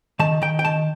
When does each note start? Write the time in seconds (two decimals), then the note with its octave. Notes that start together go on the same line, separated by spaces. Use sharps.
0.19 D#3 A5
0.42 D#3 G5
0.59 G5
0.65 D#3 A5